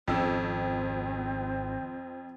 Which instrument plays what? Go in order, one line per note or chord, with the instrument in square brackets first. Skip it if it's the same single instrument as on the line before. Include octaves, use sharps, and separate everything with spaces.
[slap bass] G#1 C#4 [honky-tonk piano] F2 E6 [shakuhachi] C4